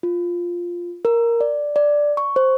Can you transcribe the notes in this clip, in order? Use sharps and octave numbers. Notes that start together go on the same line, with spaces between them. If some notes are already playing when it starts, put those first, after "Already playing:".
F4
A#4
D5
D5
C#6
C5